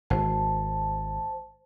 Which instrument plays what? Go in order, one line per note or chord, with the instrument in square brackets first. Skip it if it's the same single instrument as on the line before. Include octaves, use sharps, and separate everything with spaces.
[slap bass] G#1 [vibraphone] C5 A5